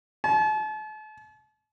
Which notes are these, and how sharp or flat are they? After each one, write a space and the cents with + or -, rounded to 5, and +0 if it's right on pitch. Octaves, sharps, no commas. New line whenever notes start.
A5 -40